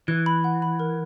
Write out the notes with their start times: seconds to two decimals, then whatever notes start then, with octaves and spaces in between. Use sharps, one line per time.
0.08 E3 F#6
0.26 B5
0.44 F#5
0.62 B5
0.80 A#4